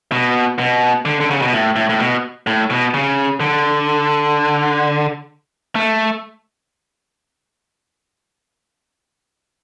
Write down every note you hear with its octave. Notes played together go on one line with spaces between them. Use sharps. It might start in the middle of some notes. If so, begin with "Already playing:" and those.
B2
B2
D3
D3
C#3
B2
A2
A2
A2
B2
A2
B2
C#3
D3
A3